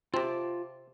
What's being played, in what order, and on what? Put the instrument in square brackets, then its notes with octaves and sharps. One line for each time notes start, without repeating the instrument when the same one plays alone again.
[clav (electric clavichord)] C3 C4 [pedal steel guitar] F4 A5 D6